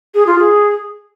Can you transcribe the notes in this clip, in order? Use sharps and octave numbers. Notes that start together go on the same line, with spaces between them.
G#4
F4
G#4